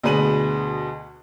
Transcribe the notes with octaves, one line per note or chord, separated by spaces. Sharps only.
D2 B2 G#4 B4 D#7 F#7